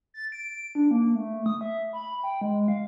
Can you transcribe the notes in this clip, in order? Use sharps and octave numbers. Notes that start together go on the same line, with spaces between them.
A6
D7
D4
A#3
A3
D#6
E5
B5
G5
G#3
F5